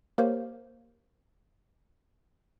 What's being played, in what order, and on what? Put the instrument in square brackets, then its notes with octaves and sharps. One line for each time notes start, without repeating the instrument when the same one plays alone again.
[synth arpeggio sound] A#3 G4 A#4 C5 C#5 F5